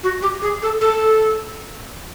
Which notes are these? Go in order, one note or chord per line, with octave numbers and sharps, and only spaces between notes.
F#4
G4
G#4
A4
A4